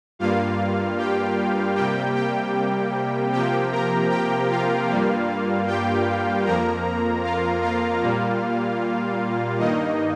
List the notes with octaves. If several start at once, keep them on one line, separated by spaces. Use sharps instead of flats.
G2 G3 A#3 F4 F5
G4 G5
C3 G3 A#3 G4 G5
G4 G5
C3 F3 A#3 G4 G5
A#4 A#5
G4 G5
F4 F5
G2 G3 A#3
G4 G5
F2 F3 A#3 A#4 A#5
F4 F5
F4 F5
A#2 G3 A#3
G2 D#3 A#3 D#4 D#5